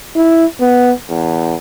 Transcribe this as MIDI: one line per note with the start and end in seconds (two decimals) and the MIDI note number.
0.16 0.45 64
0.61 0.91 59
1.10 1.54 40